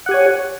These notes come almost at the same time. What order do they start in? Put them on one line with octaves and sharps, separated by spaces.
F#5 G4 G#5 C#5